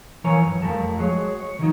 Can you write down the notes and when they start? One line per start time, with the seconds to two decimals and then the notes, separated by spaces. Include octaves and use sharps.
0.24 E3 F3 A#4 C#5 G#5 A#5
0.46 G2
0.62 F2 F3 G3 A3 A#4 A5
0.97 F#3 G#3 F#4 G#4 C#5
1.40 C#5
1.59 D#3 E3 F#3 D#4